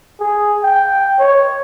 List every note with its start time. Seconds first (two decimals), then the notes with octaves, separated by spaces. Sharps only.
0.20 G#4
0.63 G5
1.19 C#5